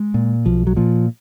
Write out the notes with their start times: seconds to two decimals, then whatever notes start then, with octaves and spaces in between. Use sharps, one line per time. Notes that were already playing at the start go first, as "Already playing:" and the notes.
Already playing: G#3
0.14 A#2
0.46 B1 F3
0.67 F#3
0.76 A#2 F3